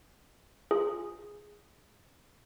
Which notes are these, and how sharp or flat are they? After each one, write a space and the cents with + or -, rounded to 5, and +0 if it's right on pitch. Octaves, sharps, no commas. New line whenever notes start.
F4 +0 G#4 +0